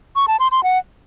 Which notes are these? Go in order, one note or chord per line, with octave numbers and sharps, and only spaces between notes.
C#6
A5
C6
C6
F#5